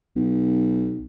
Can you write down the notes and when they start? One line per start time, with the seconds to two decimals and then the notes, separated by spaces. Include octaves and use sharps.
0.16 B1